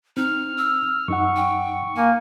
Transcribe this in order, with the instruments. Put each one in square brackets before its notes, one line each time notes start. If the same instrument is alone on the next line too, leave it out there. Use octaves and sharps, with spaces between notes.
[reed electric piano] C4 [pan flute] D#4 [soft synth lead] F6
[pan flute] E6
[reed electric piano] F#2 D#4 F#5 [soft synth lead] C#6
[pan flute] G5
[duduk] A#3 [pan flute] G#5